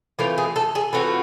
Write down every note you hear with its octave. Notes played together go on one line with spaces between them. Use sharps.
E3 A3 C4 F4 A#4
G#4
A4
G#4
E3 A3 C4 F4 F#4